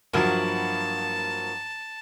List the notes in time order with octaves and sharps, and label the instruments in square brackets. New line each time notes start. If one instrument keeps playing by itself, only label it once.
[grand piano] G2 F3 F#3 [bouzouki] A#3 E4 F#4 [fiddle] A5